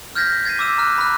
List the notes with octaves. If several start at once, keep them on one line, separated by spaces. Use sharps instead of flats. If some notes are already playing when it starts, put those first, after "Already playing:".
F6 G6 G#6 A#6 B6
G#6 A6 B6 C7 D#7
D6 E6 E7
A#5 F6 F#6
B5 F#6